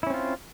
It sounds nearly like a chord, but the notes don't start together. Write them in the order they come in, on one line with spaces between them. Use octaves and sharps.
E4 C#4 C4 F4